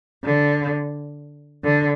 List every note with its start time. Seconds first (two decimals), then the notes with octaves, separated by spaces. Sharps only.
0.24 D3
1.64 D3